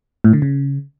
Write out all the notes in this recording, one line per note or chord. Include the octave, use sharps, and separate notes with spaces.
A2
D3
C#3